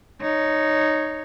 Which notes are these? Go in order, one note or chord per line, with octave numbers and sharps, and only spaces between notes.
D#4 C#5